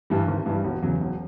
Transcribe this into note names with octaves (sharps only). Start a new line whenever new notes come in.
G2 E3 G3
G#1
G2 E3 G3
E1
E2 C#3 F#3
E1